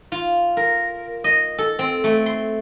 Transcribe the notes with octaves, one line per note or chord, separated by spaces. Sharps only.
F4
A#4
D#5
A4
C4
A3
C6